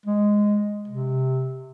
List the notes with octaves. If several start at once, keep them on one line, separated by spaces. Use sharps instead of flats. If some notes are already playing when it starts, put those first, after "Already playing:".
G#3
C3